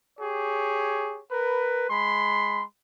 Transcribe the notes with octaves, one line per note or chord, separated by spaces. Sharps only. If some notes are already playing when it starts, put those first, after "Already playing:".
G4 G#4 C#5
A#4 B4
G#3 B5 C6